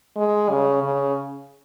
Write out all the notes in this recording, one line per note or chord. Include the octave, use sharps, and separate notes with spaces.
G#3
C#3
C#3